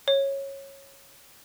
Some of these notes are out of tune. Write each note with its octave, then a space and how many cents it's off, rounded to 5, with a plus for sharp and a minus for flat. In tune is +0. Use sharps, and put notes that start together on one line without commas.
C#5 -15